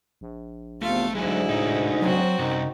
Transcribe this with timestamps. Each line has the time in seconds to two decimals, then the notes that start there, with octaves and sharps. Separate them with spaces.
0.21 A#1
0.82 E2 C3 A3 F4 F5
1.15 D2 G#2 F#3 G#3 E4 G#4
1.49 C2 A2 D#4
2.02 F#3 C4 F#4
2.39 C2 F#2 D#4